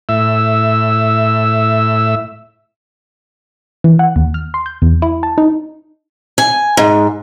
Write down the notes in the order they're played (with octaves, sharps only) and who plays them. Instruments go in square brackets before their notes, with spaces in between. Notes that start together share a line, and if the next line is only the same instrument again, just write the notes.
[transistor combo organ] A2 E5 E6
[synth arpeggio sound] E3
F#5
D#2
F6
C6
G6
E2
E4
A5
D#4
[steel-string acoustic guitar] G#5
G#2